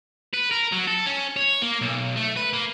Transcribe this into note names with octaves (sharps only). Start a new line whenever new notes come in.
B4
A#4
F#3
A4
C#4
C#5
A#3
B1
A3
B4
A#3